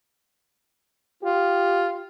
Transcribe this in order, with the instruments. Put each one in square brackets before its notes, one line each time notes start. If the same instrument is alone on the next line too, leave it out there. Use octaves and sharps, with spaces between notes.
[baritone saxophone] F4 [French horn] G4